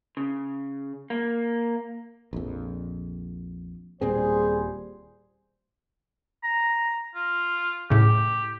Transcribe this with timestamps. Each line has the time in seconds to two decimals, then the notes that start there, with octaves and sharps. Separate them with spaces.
0.17 C#3
1.10 A#3
2.33 A#1 F2
4.02 D#1 A#2 G3 C4 G#4 C5
6.44 A#5
7.15 F4
7.90 A2 C#3 G4